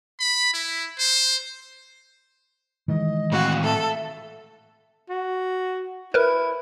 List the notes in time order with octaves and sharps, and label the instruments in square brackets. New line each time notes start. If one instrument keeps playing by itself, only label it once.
[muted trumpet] B5
E4
C5
[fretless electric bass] D#3 E3 G#3 [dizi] D#5
[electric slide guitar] A2 C4 F5 [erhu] F#4
[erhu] A4 [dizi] E5
[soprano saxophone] F#4
[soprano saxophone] E4 [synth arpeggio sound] A#4 B4